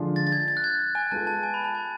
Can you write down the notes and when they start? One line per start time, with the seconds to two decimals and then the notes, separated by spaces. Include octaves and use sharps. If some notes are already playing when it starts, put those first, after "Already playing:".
Already playing: D3 F3 G#3 D4 F4
0.16 A6
0.27 A6
0.32 G#6
0.48 A6
0.57 F#6
0.64 G#6
0.95 G#5
1.11 G#3 B3 F4 A4 A5
1.27 A5
1.43 G#5
1.54 B5
1.64 A5
1.75 G#5